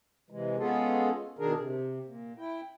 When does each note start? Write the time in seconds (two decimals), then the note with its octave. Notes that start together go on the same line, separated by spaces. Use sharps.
0.30 C3 E3 G#3
0.58 G#3 B3 C#4 F4 G#4 A4
1.39 B2 D#3 D4 G#4 A#4
1.57 C3
2.04 A#2
2.38 E4 G5